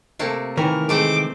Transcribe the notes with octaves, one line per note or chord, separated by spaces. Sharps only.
C3 A3 A#3
D#3 E3 A#4
G#3 A3 C4 C5 D6